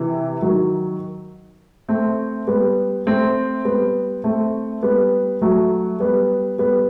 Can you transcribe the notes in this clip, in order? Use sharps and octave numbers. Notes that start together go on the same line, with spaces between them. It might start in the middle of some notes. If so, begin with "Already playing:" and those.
Already playing: C3 E3
D#3 F#3
A3 C4
G3 B3
A3 C4
G3 B3
A3 C4
G3 B3
F#3 A3
G3 B3
G3 B3